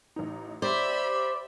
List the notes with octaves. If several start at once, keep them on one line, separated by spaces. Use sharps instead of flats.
A1 D#4
G4 C5 D5 E5 B5